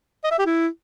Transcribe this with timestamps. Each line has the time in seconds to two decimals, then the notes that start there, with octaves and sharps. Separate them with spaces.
0.24 D#5
0.31 E5
0.38 G4
0.46 E4